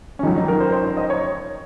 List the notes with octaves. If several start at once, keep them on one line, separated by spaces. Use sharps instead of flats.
C#4
F2 D#3 F#3 D#4
D#4
A#4
C5
C5
C5
D#5
C#5